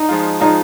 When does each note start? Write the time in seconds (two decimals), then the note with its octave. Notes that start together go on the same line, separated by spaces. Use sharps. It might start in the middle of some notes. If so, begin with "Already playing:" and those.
Already playing: D#4
0.09 F3 G#3 F4
0.40 F3 G#3 D#4 F4